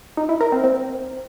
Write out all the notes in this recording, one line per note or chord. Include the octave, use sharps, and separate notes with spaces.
D#4
E4
A#4
C4
C4